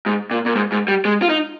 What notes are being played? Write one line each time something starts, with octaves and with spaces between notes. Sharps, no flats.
G#2
A#2
A#2
G#2
G#2
G3
G#3
F4
D#4